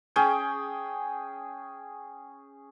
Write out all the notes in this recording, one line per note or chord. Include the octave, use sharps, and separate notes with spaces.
C#4 G#4 G5